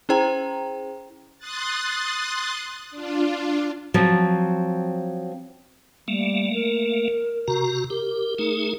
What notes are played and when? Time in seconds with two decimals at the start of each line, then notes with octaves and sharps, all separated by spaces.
0.09 C#4 E4 G#4 C5 G5 A#5
1.39 C6 D#6 F#6 A6
2.91 D4 F4
3.94 F3 F#3 C4
6.08 G3 A3 A#3
6.54 A#4
7.48 C3 F#4 A#5
7.90 G4 A#4
8.39 A3 D#4 G#4